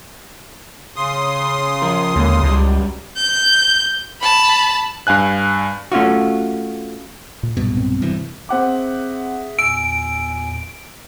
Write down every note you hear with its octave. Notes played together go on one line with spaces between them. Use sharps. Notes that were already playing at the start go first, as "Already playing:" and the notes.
C#3 C6 D#6
F3 A#4
D#2 D3 G#3 A#3
C#2 F#2 G3
G6
A5 B5
G2 F5 G#5 F#6
A3 C#4 F4 F#4
A#2
B1 G2 B2
C4
G2 C3 E3
C4 G#4 E5 F#5 D6
E2 A#2 G#5 E6 D7